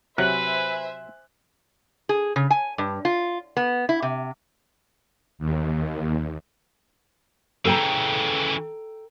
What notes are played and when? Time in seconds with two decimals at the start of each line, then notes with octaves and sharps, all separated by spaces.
0.18 C3 F#3 B4 C5 E5 G#5 F#6
2.09 G#4
2.36 C#3
2.51 G#5
2.78 G2
3.05 F4
3.57 B3
3.89 E4
4.02 C3
5.39 D#2
7.65 C#3 E3 A4 G5 A#5